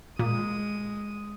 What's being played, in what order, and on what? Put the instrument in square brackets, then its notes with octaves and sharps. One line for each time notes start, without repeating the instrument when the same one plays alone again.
[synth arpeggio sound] A#2 [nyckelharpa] G#3 D#6